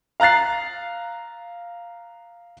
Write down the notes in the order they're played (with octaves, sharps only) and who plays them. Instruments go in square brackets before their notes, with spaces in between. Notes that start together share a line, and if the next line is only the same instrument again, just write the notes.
[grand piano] F5 A#5 F#6 A6 C7